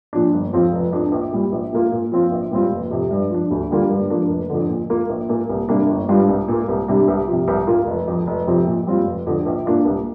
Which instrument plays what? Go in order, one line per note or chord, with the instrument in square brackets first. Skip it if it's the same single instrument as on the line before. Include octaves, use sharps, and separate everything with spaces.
[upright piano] A#2 F3 D4
G1
F2 F3 C4 F4
F1
F2 F3 D4
A#1
A#2 G3
A#1
A#2 A#3 F4
A#2
F3 C4 F4
A#1
A#2 G3 C4 F4
F1
F2 C3
G2
F3 D4
D2
D3 G3 A#3 F4
G2
F3 A#3 D4
F1
F2 D3
A#2
A#3 F4
A#1
A#2 A#3
C2
C3 G3 A#3 D4
G1
G2 G3 D4 F4
C2
A#2 A#3
C2
C3 G3 D4
C2
C3 F3
C2
A#2 A#3 F4
F1
F2 F3
F1
F2 C3 F3 C4
A#2
G3 C4 F4
F1
F2 D3
A#1
A#2 A#3 D4 F4
C2